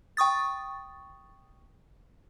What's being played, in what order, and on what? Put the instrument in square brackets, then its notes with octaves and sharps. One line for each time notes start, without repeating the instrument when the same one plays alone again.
[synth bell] G5 C#6 D#6 A6